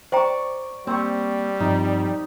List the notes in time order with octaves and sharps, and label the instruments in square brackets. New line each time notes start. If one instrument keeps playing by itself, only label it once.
[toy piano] C5 G5 A#5 [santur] D5 C#6
[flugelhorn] G3 [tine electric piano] A#3 [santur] C4 C#6
[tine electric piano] G2 F3 C4 [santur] D#4